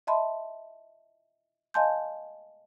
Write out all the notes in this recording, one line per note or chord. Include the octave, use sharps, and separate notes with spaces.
D#5 E5 A5 B5 C6
D#5 F5 G#5 A5 C6 G6